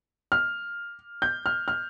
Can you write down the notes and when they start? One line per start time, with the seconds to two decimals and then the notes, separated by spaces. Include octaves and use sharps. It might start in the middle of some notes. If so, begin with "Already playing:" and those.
0.32 F6
1.22 G6
1.46 F6
1.68 F6